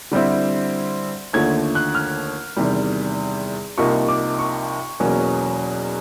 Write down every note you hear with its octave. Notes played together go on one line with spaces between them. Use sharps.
D3 G3 C4 E4
D#2 D3 F3 A3 G#6
F#6
F6
E2 C3 D#3 G3
C2 C3 F3 A#3 D#4 C#6
D6
C#6
E2 B2 F#3 A#3 C#4